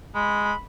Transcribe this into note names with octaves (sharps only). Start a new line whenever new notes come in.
G#3 B5